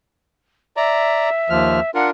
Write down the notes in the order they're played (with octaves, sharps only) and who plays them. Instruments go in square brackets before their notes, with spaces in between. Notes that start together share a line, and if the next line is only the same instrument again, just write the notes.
[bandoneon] D5 A#5 [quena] E5
[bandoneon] D#2 F3 F6
[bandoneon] D4 F4 A#4 [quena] F#5